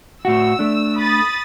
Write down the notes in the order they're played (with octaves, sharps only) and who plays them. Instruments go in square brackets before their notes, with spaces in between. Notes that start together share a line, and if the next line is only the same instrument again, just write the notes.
[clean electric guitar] A2 F#4 [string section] E6
[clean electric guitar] A3 D4
[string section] B5 D#6 A6